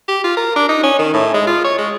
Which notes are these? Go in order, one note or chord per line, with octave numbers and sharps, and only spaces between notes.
G4
F4
A#4
D4
D#4
C#4
D#3
A2
G#3
F4
C#5
G#3